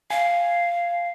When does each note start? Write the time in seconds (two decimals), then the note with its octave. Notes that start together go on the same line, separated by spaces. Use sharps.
0.10 F5 G#5